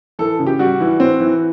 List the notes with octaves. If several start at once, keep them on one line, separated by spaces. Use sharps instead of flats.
E3 A4
C#3
G4
G3 F#4
E3
C4
E3